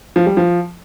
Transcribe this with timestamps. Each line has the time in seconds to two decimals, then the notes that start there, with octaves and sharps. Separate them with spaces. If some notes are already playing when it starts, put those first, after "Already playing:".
0.16 F3
0.26 G3
0.37 F3